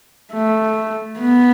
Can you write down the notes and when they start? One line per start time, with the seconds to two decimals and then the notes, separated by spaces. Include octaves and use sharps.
0.33 A3
1.19 B3